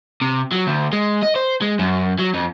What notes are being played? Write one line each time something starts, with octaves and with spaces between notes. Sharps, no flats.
C3
F#3
D2
G#3
D#5
C5
G#3
F#2
F#3
F2